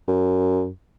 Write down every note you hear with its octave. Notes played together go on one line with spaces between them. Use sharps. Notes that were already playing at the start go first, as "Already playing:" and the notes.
F#2